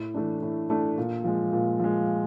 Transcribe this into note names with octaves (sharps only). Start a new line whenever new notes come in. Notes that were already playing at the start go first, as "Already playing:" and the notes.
Already playing: A2
E3 A3 D4
A2
E3 A3 D4
A#2
F3 G#3
A#2
F3 G#3